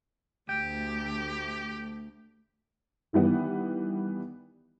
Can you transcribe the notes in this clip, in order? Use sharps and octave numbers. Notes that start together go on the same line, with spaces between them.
D2 A3 G4 G5
D#3 E3 G3 B3